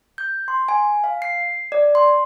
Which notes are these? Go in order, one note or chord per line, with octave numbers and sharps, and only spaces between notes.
G6
C6
G#5
F5
C7
D5
C6